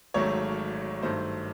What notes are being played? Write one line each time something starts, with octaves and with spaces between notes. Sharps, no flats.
G#1 G#2 D#3 F#3 A3 C#5
G2 D#3 F#3 A3 C5